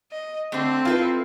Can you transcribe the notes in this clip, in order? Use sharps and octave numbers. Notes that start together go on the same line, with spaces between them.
D#5
D3 A3 C4
E4 F4 A4 B4